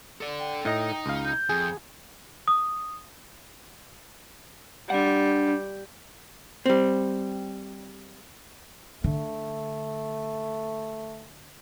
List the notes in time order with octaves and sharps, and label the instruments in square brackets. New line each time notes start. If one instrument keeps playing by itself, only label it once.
[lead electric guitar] A4 D5
[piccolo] G5
[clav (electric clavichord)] A2 D#5 A#5 [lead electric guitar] D#4
[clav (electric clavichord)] C#2 F5
[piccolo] G6
[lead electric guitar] F2 [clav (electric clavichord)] G#4
[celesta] D#6
[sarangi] G3 [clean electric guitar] D4 F#5
[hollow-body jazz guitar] G3 C4
[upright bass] D3 [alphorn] A3